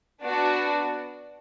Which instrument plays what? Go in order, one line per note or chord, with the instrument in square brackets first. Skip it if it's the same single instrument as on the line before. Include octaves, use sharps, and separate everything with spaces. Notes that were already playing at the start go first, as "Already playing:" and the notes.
[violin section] B3 D4 F#4